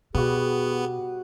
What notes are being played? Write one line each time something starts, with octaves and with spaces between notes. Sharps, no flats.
B2 G3 B3 F#4 G#4